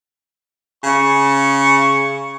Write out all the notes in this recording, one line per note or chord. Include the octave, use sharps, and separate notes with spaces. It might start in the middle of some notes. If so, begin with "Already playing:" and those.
C#3 C#6